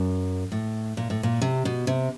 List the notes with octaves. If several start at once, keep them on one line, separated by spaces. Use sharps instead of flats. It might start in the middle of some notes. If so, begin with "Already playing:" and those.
Already playing: F#2
A2
A#2
A2
A#2
C3
B2
C3